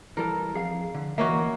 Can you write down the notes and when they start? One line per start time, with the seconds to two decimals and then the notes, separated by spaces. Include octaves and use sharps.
0.17 E3 G3 A4 A#4
0.54 F2 G#4 F5
0.95 D3
1.18 E3 A#3 C#4 F#4 D#5 E5